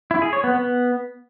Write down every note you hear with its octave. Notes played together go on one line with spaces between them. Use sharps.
E4
G#4
C#5
B3
B3